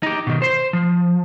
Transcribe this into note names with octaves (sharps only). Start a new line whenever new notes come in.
D#4 G4
B2 D#3
C5 C6
F3